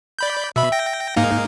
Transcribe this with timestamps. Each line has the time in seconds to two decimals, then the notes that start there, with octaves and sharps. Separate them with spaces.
0.19 D5 B5 G6
0.56 B2 E5 B5
0.72 G5 A#6
1.17 G#2 A#3 D#4 F5 G#5